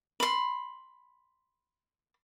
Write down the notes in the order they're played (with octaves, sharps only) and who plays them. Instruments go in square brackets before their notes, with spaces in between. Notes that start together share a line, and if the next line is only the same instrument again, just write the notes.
[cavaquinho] B5 C6